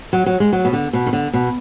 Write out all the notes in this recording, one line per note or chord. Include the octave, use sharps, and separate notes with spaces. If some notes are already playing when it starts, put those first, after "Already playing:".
F#3
F#3
G#3
F#3
B2
D3
B2
D#3
D3
B2